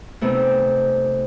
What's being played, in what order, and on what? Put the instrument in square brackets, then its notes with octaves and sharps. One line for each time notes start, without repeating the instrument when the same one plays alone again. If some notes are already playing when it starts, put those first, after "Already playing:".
[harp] C3 A3 B3 D#4